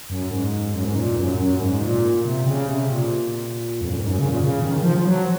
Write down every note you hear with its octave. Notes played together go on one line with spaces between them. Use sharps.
F#2
G#2
F#2
G#2
A#2
F#2
F#2
G#2
A#2
C3
C#3
C3
A#2
F2
F#2
G#2
F#2
C#3
A#2
C#3
D#3
D#3
F3
F3
F#3